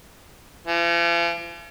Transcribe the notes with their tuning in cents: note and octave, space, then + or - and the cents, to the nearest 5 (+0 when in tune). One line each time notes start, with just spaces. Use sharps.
F3 -45